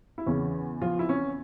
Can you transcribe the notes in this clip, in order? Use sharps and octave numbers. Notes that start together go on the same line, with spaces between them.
E4
E2 C#3 E3 C#4
F3 F4
E4
C#4